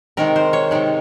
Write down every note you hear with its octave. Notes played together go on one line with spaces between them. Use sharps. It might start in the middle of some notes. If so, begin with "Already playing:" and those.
C3 D#3 G#3 A#4
C5
C#5
C3 D#3 G#3